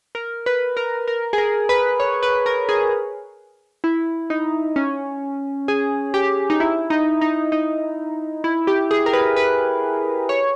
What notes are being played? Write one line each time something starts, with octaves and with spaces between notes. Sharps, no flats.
A#4
B4
A#4
A#4
G#4
A#4
B4
C#5
B4
A#4
G#4
E4
D#4
C#4
G#4
G4
D#4
E4
D#4
D#4
D#4
E4
G4
G#4
A#4
B4
B4
C#5